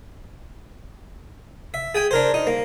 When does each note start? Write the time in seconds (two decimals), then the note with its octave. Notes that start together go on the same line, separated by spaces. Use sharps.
1.74 E5
1.95 G#4 G5 G#5
2.11 D4 A#4 C5
2.34 D#4
2.47 A#3